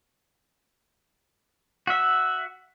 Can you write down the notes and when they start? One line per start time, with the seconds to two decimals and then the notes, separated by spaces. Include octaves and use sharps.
1.87 F#4 E5